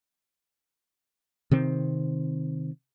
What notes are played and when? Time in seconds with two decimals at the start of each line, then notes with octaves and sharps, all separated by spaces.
1.51 C3 D#3 C4